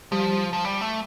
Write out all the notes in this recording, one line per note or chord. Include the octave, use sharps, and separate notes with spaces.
F3 G3
F3
G3
A3